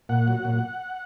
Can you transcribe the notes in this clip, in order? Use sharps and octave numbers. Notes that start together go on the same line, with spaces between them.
A#2 F#5
F#3
A#2